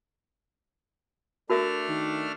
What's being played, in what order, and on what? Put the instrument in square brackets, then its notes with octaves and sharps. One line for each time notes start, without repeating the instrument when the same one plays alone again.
[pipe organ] A3 D4 F6 [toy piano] F#4 A#4 E5
[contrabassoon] D#3